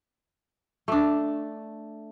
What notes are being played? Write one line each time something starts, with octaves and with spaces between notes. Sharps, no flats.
A3 D4